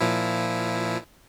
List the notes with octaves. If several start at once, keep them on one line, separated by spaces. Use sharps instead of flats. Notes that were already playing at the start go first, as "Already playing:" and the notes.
A#2 F3 E4